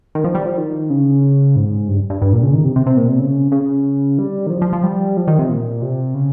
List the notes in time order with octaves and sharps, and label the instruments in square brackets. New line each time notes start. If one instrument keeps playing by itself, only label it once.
[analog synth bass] D#3
F3
G3
F3
D#3
C#3
G#2
G2
G2
G2
A#2
C#3
D#3
C3
C3
C3
A#2
C3
C#3
C#3
G3
D#3
F3
F3
F3
G3
F3
D#3
C3
A#2
C3
C#3